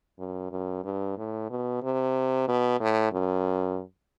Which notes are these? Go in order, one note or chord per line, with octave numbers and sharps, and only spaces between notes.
F#2
F#2
G2
A2
B2
C3
B2
A2
F#2